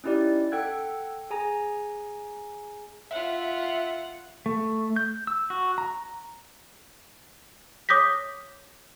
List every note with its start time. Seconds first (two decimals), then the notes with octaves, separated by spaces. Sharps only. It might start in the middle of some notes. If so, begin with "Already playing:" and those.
0.04 C#4 D#4 E4 G4 D5
0.52 A4 F#5 G5 E6 F#6 G#6
1.30 G#4 G#5 A#5
3.11 F4 E5 F#5
4.46 A3
4.96 G6
5.27 E6
5.50 F#4
5.78 A#5
7.89 C#5 D6 D#6 G6 A#6 B6